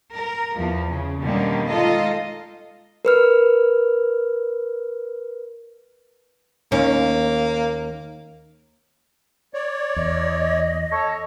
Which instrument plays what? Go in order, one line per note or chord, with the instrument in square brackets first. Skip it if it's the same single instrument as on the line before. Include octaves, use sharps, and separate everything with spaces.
[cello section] A#4
E2 F3
C#3
B2 D3 D#3 G3 A#3 C#4
G#3 D#4 F4 A4 D#5 F5
[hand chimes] A#4 B4 F6
[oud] D#2 C#4 [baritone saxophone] A#3
[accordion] C#5 D5
[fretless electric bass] E2 [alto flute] D#5
[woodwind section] A4 C#5